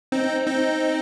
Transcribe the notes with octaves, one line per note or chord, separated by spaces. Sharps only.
C4 D#4
C4 D#4